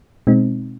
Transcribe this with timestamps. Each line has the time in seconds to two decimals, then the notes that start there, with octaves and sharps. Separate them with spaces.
0.27 B2 G#3 C4 D#4